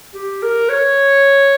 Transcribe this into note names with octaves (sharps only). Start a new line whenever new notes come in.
G4
A#4
C#5